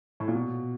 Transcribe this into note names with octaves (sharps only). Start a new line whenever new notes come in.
A2
A#2
B2